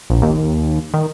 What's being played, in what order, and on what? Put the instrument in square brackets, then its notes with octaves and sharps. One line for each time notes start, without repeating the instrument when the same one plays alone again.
[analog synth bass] A#1
D#2
D#3